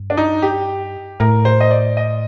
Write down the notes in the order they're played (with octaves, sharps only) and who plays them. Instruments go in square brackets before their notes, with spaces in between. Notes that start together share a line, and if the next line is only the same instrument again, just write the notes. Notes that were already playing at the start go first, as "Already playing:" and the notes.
Already playing: [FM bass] G2
[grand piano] D4
D#4
G4
[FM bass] A2 [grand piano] A#4
[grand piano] C5
D#5
D5
D#5